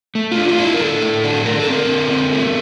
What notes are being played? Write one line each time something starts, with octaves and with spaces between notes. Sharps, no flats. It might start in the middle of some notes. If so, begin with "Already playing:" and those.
A3
F4
D4
F4
D4
E4
A#4
A2 A4
A2
D4
D3 A#4
A4
C4
A#4
D3
C4
A3